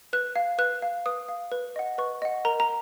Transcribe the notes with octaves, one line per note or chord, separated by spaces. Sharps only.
B4 F#6
F5
B4 F#6
F5
B4 D#6
F5
B4
D#5 F#5
B4 C#6
D#5 F#5
A#4 A#5
A#5